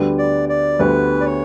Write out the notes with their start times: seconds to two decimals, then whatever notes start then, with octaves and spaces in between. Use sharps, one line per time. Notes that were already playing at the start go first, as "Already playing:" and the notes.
Already playing: D2 D3 G3 B3
0.18 D5
0.49 D5
0.79 D2 D3 G3 B3 B4
1.20 D5
1.25 C#5